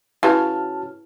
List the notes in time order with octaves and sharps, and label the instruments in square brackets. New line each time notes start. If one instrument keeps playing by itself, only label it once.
[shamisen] C#3 [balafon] E4 B4 [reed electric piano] F#4 A5 F6